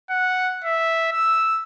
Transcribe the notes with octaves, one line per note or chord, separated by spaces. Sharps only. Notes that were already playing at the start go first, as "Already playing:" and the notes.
F#5
E5
E6